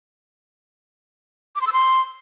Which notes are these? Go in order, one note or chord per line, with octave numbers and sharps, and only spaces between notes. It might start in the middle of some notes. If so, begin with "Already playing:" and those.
D6
C6
E6
C6